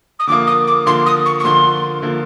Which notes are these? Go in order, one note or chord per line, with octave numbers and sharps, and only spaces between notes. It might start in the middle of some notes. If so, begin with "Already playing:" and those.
D#6
D3 F3 A#3 D6
D#6
D6
D3 F3 A#3 C6
D#6
C#6
C#6
D3 F3 A#3 C6
D3 F3 A#3